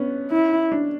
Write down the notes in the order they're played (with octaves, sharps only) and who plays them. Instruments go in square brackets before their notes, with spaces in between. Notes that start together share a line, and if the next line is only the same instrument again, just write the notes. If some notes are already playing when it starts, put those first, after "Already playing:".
Already playing: [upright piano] B3 C#4 D4
[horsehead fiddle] E4
[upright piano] D4